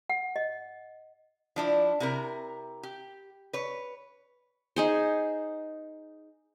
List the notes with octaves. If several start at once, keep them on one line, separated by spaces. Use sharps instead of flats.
F#5
D#5
F3 D4 E4
C3 E4 A#4
G4
B4 C#5
D#4 G#4 C5